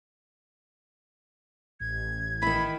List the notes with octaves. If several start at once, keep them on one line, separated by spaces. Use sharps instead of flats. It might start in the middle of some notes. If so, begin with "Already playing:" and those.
A1 G#6
D#3 E4 B5